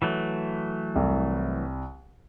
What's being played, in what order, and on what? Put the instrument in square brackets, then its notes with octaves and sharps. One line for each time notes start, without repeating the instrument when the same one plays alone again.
[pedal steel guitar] E3 F#3 A3
[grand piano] C2